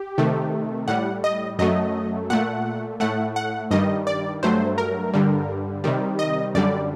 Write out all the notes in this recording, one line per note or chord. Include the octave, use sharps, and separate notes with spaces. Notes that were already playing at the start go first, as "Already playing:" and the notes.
Already playing: G4
C3 D#3 A3
A2 G3 F#5
D#5
F#2 F#3 A3 D#5
A#2 A3 F#5
A2 A3 F#5
F#5
G2 D#3 G3 D#5
D5
G2 F#3 A3 C5
A#4
G2 D3 G3
C3 D#3 G3
D#5
F#2 D3 G3 D5